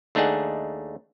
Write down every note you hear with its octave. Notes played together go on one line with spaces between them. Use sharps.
D#2 A3 D4 D#4 G#4 F#5